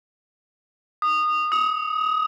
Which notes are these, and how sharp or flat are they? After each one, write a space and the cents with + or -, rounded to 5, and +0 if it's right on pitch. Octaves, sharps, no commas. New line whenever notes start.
D#6 -20
D#6 +30